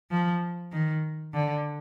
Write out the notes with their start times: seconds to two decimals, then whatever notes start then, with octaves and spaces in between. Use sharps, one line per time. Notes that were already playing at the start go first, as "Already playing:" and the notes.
0.11 F3
0.72 D#3
1.34 D3